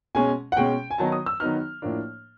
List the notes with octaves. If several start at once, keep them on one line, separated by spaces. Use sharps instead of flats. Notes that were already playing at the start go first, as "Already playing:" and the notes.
B2 G#3 C#4 G#5
F#5
B2 G#3 C#4 G5
G#5
D#3 F#3 B3 D#4 A5
D#6
E6
D#3 F#3 B3 D#4 F6
A2 F3 A#3 D4